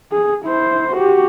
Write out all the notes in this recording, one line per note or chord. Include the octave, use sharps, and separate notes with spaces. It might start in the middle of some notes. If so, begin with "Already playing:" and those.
G#4
E4 C5
F#4 G4